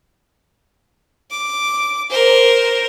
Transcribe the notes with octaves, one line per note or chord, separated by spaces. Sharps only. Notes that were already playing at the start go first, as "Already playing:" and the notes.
D6
A#4 C5